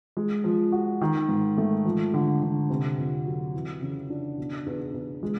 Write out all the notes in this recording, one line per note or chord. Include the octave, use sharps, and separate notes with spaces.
G#3
F3
F#4
D#3
G#2
A3
F3
D3
D3
C3
F2
F#3
E3
C#3
D4
B2
E2
E2
G#3